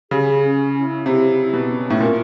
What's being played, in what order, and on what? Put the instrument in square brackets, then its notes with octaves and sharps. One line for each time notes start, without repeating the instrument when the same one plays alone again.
[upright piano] C#3 [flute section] G#4
[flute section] C#4
E4
[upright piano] C3 [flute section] E4
[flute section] E4
[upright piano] B2
[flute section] C#4
[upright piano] A2
[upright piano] A#2 [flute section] A#4